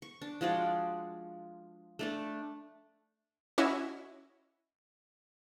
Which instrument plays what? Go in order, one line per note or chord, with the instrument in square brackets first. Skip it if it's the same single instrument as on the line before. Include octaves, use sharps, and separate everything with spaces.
[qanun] C#6
D4
F3 G#3 F#4 D5
A3 D4 D5
[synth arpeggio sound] C#4 E4 F#4 C#5 D#5 E5